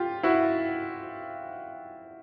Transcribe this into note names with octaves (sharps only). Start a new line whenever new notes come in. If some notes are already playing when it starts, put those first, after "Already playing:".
Already playing: F4 G4
E4 F#4